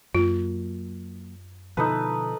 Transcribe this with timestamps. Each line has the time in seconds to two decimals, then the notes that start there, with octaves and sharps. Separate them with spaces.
0.15 F#2 F#3 A#3 F4
1.77 B2 D3 F3 D#4 A4 B4